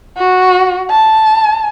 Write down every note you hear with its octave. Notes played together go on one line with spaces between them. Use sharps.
F#4
A5